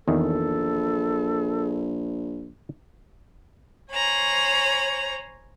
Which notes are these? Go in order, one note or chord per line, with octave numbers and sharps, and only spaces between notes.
A#1 E2 D#3 A4
C5 C#5 G#5 A#5 B5